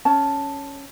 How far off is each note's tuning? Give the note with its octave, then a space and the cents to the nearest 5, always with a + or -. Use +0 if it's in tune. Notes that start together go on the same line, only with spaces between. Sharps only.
C#4 +0 A5 +0